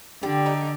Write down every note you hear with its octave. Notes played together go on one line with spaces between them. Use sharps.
D3 G3
D#4